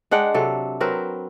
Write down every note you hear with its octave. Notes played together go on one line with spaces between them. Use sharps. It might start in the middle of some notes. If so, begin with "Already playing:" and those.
G#3 D4 F#5 G5
C3 F#3 A4
F#3 C4 A#4 B4